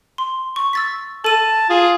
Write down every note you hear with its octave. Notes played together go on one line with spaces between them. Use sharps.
C6
C#6
E6 A6 B6
A4 A5 D#7
F4 G#4